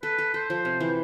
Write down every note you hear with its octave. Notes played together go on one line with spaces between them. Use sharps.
A4 B4
A4
A4 C5
F3
C3
E3